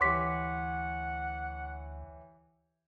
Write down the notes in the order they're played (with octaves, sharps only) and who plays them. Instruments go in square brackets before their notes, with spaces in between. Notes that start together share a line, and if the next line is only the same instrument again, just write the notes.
[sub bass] D2 [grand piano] E3 G4 C#5 [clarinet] F#5 [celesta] C6 D6 B6